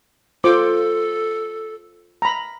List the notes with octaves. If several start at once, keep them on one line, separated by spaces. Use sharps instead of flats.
F4 A4 C5 D6
A#5 B5